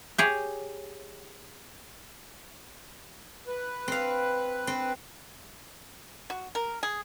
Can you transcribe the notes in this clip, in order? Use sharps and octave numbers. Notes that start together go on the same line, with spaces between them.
G4 G#4 C#5
B4
C4 F5
C4
F#4
A#4
G#4